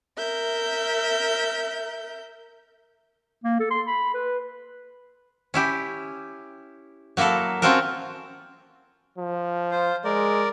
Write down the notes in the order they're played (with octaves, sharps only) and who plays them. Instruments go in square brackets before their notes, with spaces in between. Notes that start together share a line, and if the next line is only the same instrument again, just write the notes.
[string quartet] A#4 E5 G6
[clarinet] A#3
A4
C6
B5
B4
[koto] C#4 E4 G4
F#3 A#3 E4 F#4 A4
C4 C#4 F4 F#4 A4 A#4
[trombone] F3
[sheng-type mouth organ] F4 C5
[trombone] G#3 [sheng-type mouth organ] A#4 D5